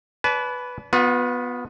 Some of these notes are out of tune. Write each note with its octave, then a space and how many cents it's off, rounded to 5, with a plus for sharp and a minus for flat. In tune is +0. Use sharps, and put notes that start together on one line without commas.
B4 +5 D5 -35 A5 -40
B3 +0 F4 +45